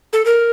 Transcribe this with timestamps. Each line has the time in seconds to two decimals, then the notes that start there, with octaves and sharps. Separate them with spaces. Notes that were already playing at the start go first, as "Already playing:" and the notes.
0.13 A4
0.26 A#4